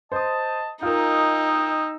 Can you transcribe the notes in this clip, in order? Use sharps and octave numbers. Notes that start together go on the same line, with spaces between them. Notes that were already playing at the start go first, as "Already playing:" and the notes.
C5 D#5 A5 D#6
D#4 F4 A#4 D#5 G5 E6